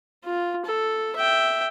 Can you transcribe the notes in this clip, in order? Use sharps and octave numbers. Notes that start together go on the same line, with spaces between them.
F4
A4
E5 G5